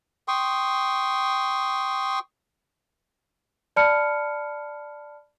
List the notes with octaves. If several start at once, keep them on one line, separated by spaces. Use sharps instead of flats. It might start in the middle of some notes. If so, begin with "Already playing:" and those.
G5 C6 C#6 D#6
D5 A5 B5 F6 C#7